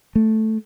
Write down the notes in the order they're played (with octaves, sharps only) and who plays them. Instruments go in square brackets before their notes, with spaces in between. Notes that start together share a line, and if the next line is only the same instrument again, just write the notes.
[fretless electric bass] A3